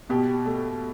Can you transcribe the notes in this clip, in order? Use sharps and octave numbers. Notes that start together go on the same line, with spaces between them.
B2 G4
A3